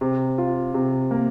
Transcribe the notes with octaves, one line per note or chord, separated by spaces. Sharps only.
C3
F4
C3
A#3